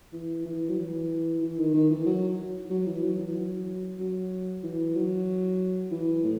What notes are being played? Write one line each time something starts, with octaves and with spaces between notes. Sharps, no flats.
E3
E3
F#3
E3
E3
D#3
D#3
E3
F#3
F#3
E3
F#3
E3
F#3
F#3
E3
F#3
E3
A2